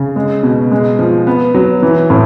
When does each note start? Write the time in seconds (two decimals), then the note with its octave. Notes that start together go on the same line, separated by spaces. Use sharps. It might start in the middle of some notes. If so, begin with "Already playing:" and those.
Already playing: C#3
0.16 G#3
0.43 B2
0.71 G#3
0.99 F3
1.27 B3
1.55 F#3
1.82 E3
2.10 A2